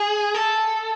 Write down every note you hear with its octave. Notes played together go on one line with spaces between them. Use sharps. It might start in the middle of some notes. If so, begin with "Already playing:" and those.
Already playing: G#4
A4